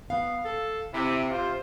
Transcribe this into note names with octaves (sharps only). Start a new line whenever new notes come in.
B3 F5
A4
C3 E4
C3 F4 C5